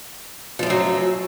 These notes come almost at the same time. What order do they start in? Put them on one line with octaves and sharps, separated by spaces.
F3 F#2 A3 F#3